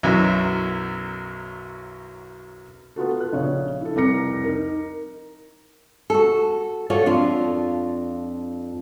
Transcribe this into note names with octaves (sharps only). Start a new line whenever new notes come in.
B1 F#2 F#3 E4
B3 F4 F#4 A4
A4 F#6
A#1 C#3 C#5
E4 A4
F1 C2 A#5 D6 A#6 C#7
D#4 A#4
F#4 A4
D4 F4 F#4 A4 C#5
F2 D4 F4